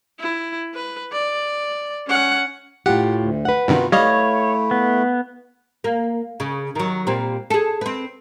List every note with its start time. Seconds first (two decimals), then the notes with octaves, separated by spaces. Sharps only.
0.20 E4
0.75 B4
1.12 D5
2.07 C#4 F#5
2.86 A2 F4 G4 F#5
3.15 D2
3.45 B4 F#5
3.68 G2 C3 D#3 B3 F4 F#4
3.92 G3 A3 E4 C#5 D#5 F5
4.71 B3
5.84 A#3
6.40 C#3
6.75 D#3 F#3
7.07 A#2 G3 C4
7.50 G#4 A4
7.81 C4 B4